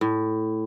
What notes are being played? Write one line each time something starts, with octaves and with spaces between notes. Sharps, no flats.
A2